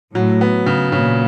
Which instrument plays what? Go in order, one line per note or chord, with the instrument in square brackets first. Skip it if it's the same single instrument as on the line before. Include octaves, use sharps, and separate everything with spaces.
[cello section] A2 [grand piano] F#3
[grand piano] B3
C#3
[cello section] A#2 [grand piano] C#3